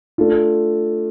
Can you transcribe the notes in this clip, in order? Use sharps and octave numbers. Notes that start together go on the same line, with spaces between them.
A3 D4 F4